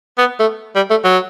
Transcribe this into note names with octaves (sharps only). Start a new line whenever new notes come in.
B3
A3
G3
A3
F#3